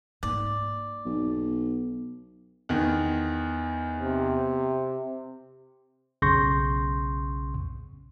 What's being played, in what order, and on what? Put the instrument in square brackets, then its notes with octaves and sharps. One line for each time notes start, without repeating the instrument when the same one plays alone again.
[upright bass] G#2 A#3 [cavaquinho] D5
[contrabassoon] B1
[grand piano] E2 D#3
[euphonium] C3
[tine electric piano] B1 C#3 C6 C#6 G6 A#6